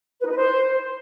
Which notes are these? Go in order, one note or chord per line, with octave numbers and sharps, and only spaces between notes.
B4
D#4
B4
C5